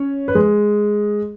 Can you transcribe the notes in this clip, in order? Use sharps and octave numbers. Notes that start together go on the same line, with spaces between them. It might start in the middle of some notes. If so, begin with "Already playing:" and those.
Already playing: C#4 C#5
B4
G#3 G#4